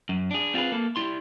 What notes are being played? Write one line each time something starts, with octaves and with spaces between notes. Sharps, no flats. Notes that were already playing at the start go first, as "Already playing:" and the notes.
F#2
D4 G#4
C4 F4 F#4 G#4 B4
A#3 A4
G3 E4 C6